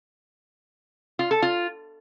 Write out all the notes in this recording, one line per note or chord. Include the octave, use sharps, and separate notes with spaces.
F4
A4
F4